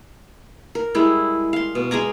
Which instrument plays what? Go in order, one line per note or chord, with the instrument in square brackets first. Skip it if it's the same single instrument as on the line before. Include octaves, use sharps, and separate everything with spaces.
[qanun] A#4
G3 G#3 E4
F5 C6
B2
G#3 G#5 A#5 D6